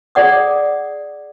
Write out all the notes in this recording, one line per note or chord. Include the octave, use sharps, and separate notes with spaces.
G#4 D5 F#5 D#6